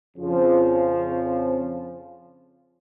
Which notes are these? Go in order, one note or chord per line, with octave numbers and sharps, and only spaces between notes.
F2 C#3 F3